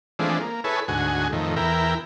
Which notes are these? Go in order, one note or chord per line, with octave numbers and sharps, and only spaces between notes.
E3 F3 G#3 A3 C4 D4
A#3
E4 G#4 A4 B4 C#5
D2 G#2 F#4 G#5
F2 A2 D#3
E2 E4 A#4 G5